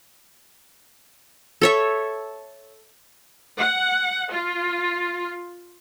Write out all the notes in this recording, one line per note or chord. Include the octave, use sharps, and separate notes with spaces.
A4 C#5 E5
F#5
F4